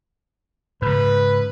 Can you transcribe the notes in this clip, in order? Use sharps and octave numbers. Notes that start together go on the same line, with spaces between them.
G#2 C#3 B4